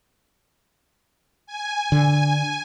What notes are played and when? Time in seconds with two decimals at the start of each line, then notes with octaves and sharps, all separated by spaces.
1.46 G#5
1.92 D3